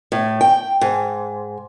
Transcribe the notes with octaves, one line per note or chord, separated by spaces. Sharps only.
A2
G5
G#2